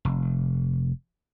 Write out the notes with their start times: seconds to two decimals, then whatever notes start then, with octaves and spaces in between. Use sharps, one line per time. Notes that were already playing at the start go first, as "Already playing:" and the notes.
0.05 F1